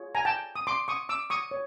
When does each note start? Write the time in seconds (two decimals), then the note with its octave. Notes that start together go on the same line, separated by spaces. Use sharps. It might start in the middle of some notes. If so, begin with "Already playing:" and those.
Already playing: F4 G#4 C#5
0.15 G#5 A#5
0.25 G5 A5
0.56 D#6
0.67 C6 D6
0.88 C#6 D#6
1.09 D6 E6
1.30 C#6 D#6
1.51 C#5